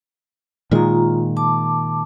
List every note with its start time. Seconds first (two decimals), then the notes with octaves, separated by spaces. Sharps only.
0.71 A#2 D#3 G#3 F4 A#5
1.37 A5 D6